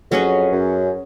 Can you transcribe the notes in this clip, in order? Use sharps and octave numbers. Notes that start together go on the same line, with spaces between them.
F2 F#3 C#4 G#4 B4
F#2